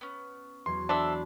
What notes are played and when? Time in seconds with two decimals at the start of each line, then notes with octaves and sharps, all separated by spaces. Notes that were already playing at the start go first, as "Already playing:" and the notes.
0.01 B3 C#4
0.66 E2 F#3 C6
0.89 D4 A4 C5 E5 B5